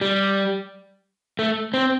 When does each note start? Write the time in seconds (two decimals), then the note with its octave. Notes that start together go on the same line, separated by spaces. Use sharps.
0.01 G3
1.39 A3
1.74 C4